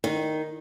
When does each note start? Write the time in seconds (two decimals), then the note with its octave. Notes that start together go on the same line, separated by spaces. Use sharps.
0.04 D#3